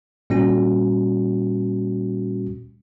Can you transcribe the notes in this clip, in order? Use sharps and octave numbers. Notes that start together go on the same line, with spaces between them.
A#2 G3 C#4 F#4